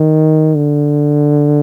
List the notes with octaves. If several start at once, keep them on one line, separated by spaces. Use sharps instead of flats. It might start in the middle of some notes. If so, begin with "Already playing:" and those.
Already playing: D#3
D3